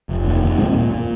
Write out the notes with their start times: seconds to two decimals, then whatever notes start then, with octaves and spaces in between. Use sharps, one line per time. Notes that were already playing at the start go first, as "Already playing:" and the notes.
0.09 F1
0.25 D#2
0.42 D#2
0.58 A#2 G#3 C4
0.75 A#2
0.91 A#2